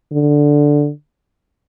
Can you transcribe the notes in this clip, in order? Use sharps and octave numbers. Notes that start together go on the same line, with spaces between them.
D3